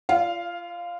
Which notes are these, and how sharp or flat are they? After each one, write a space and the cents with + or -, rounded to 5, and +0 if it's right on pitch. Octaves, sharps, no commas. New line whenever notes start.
F4 -30 D5 -25 F5 +0